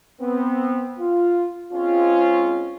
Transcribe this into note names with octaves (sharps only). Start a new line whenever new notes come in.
B3 C4
F4
G#3 C4 C#4 F4